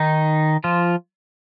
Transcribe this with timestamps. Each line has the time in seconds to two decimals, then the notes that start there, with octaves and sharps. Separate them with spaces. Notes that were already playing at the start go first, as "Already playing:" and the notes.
Already playing: D#3 D#4
0.64 F3 F4